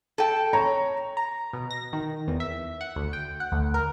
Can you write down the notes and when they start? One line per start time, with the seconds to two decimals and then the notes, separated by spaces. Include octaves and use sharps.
0.18 A4 G5
0.53 C#5 A#5
1.17 A#5
1.53 B2
1.71 A#6
1.93 D#3
2.28 E2
2.40 E5
2.81 F#5
2.96 D2
3.13 G5
3.40 F#5
3.52 D2
3.74 A#4